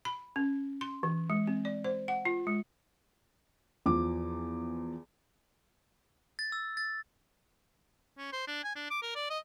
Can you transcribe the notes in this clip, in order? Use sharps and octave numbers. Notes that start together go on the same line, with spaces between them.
B5
C#4
C6
E3
G#3
C4
D5
C5
F#5
F4
G#3
E2 F3 D6
A6
E6
A6
C#4
C5
D4
G#5
D4
D6
A#4
D5
D#5